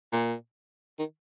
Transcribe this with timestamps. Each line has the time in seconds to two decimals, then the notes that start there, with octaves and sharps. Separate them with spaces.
0.13 A#2
0.99 D#3